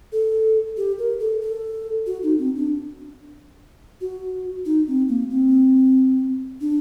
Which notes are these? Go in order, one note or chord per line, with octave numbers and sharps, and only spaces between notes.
A4
G4
A#4
A4
A4
F#4
D#4
C4
D4
F#4
D#4
C4
A#3
C4
D4